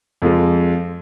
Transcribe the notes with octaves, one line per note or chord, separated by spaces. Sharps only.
F2 F3 G#3